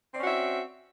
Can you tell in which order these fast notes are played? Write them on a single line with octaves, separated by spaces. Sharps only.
C4 D5 C#4 F#4 E5